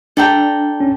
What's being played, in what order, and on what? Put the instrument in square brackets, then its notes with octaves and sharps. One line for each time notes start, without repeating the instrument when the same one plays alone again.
[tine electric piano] D4 [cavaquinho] A4 D5 G5 A#5
[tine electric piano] C#4